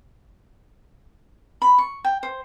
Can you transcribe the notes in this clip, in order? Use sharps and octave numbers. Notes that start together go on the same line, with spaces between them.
B5
C#6
G5
C5